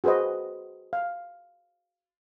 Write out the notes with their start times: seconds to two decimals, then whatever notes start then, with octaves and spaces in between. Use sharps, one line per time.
0.04 F#4 G#4 B4 C5 D#5
0.93 F5